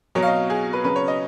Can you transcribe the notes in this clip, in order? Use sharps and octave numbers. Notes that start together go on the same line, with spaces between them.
B2 F#3 C#5
F5
D#5
G#4
B4
C#3 F#3 B4
C#5
D#5